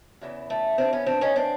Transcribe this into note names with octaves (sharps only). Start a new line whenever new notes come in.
E2 C#3 E3
A3
C4 D4
B3 C#4
C4 D4
C#4 D#4
C4 D4